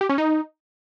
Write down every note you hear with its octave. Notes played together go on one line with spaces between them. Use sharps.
G4
C#4
D#4